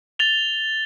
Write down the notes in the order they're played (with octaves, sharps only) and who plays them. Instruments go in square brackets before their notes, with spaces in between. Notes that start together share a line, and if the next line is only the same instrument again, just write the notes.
[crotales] A6 F7 G7